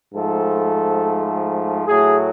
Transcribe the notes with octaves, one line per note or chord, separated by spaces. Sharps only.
G#2 F3 A3 A4
A2 F#3 A3 G#4